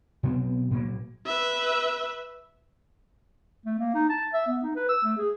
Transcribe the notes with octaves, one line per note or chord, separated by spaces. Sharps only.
B2 F#3 B3 C4
A#2 F#3 A#3
B4 E5
A3
A#3
D#4
A5
E5
B3
D#4
B4
E6
A3
G#4